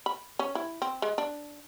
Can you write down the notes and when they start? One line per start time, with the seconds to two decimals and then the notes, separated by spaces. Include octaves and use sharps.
0.06 B5
0.39 C#4
0.55 E4
0.82 C4
1.02 G#3
1.18 D4